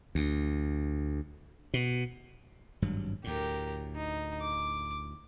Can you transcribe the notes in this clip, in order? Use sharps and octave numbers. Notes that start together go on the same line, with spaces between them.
D2
B2
G#1 G2 F#3
D2 A2 G4 A#4
D#4
D6